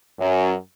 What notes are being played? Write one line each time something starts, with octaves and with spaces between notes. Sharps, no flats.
F#2